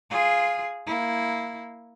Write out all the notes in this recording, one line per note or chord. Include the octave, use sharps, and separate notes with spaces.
F4 G#4
A#3 E4